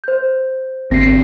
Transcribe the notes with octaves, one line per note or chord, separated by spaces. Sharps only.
C5 G6
G#1 D3 C4 A#6 C7